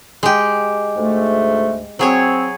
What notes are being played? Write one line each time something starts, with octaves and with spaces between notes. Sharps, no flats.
G#3 G4
D2 G#2 A3
F#3 C4 G#4 C#5